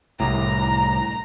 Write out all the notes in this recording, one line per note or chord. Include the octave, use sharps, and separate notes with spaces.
C2 A2 A#5